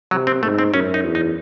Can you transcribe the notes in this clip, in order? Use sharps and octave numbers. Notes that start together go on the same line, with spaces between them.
C3 F#3
C4
G#2 A3
C4
F#2 C#4
D#4
E2
D#4